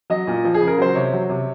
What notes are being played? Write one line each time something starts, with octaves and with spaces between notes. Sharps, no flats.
F#3 D#5
A#2
F3
G#4
C#3
A#4
F#3 C5
C3 C#5
F#3
C3